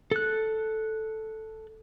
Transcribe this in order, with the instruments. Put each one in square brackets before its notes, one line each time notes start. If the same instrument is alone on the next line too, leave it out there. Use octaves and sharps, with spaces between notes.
[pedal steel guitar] A4 F#6